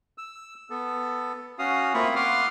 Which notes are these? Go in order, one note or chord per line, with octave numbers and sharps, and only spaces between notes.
E6
B3 A4
C#4 F#4 F5 D#6
A3 A#3 C4 F4 B5 C#6
F5 F#5 C6 D6 D#6 F6